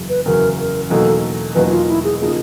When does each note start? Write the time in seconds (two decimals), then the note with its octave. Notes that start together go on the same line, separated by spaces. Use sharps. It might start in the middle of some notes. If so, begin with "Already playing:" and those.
Already playing: F#1 E2 C#3 F#3
0.09 B4
0.26 F#1 E2 C#3 F#3 A#4
0.59 A#4
0.90 E2 B2 F#3 A#3 D#4 A4
1.55 E2 B2 F#3 A#3 D#4 B4
1.66 F#4
1.71 F4
1.88 E4
2.04 G#4
2.21 C#3 F3 A#3 D#4 G#4